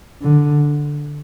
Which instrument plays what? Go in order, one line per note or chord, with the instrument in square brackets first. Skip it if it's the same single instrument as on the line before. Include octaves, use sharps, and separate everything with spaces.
[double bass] D3